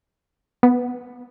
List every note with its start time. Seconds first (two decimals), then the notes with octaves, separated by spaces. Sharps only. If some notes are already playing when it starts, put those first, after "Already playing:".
0.63 B3